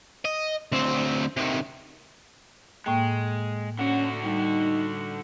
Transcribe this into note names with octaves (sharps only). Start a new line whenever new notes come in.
D#5
D2 C4
C3 D#3
A2 G#3 A#3 G5
D3 C#4 F#4 F#5
G3 D#4